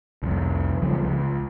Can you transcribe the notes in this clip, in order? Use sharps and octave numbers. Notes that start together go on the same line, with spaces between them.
C2 F2
C#2 F3 G3
C#2